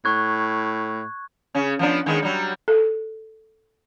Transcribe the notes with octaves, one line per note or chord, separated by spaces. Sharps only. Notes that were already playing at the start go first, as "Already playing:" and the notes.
A2 C#6 F#6 G#6
C#3 C#4
F3 B3 D4
D#3 G#3 B3
F#3 G3
A4